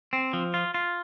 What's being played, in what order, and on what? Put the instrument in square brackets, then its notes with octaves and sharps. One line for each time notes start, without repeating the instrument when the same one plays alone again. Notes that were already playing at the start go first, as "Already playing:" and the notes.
[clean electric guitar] C4
F3
F4
F4